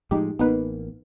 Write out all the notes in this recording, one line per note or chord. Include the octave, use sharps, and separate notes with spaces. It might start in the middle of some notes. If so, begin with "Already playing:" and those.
A2 F3 G#3 D#4 G4
A1 A#3 B3 D#4 B4